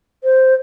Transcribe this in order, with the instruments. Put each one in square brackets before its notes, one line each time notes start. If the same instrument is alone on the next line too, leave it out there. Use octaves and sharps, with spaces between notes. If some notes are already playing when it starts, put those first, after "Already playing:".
[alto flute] C5